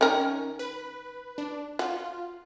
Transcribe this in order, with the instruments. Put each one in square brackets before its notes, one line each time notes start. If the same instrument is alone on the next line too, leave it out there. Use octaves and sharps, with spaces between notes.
[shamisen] D#3 A#4 [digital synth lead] C#4
[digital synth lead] B4
D4
[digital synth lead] F4 [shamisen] F#4